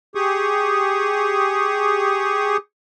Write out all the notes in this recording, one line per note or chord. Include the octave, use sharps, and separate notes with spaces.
G4 G#4 C#6 D#6